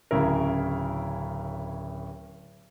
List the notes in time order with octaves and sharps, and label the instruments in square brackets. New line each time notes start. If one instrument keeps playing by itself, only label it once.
[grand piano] D1 C#3 E4 A#4